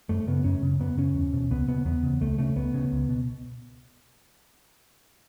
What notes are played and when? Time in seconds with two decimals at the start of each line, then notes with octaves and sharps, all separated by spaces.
0.09 F#2 A3
0.28 C#3 B3
0.44 F#2 C#4
0.63 C#3
0.80 F#2 B3
0.97 C#3 C#4
1.15 E2
1.33 B2
1.51 C#2 B3
1.68 C#3 B3
1.85 E2 B3
2.03 C#3
2.21 C#2 A3
2.38 C#3 A3
2.56 C#2 B3
2.74 C#3
2.92 C#2
3.09 B2